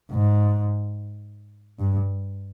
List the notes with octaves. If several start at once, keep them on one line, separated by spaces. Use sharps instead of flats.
G#2
G2